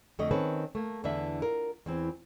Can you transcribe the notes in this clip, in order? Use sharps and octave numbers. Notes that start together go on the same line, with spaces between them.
F2 D3 A3 D#5
D#3 C4 C#4 A4 B4
A3 A#3
E2 D3 E3 D4 E5
F4 A#4
E2 E3 C4